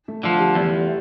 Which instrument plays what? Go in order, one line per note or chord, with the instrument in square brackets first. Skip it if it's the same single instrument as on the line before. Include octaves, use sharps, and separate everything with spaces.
[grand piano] A3
[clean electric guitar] D3 F3 [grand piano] A3
[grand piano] G3
[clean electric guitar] E2 [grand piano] G3